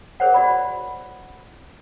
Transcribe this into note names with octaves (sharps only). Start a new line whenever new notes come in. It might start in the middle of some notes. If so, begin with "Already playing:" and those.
G#4 A#4 C5 C#5 F#5
F#4 D5 B5